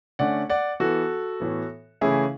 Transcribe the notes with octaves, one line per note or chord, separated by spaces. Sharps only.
D3 A3 C#4 D5 F#5
D5 F#5
E3 B3 F#4 A4
A2 E3 B3
C#3 E3 A3 C#4 E4 G#4